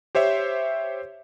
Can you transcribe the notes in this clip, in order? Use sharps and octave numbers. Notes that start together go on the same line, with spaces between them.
G4 C5 C#5 E5